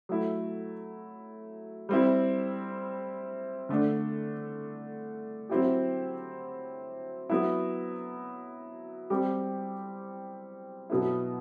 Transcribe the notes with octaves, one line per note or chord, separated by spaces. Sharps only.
F#3 A3 E4
G3 C4 E4
D3 A3 D4
F#3 C4 E4 G4
F#3 B3 E4
G3 C4 G4
B2 F#3 B3 E4